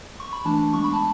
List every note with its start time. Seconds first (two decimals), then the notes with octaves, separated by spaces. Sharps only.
0.20 C#6
0.33 B5
0.45 E3 A3 D4 A5
0.73 G#3 B3 D4 C#6
0.84 B5
0.93 A5